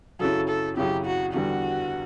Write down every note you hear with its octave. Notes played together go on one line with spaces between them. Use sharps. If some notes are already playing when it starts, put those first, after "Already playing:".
F#2 C#3 F#3 C#4 E4 A4
A4
F#2 C#3 F#3 C#4 E4 G4
F#4
E2 D3 G3 F#4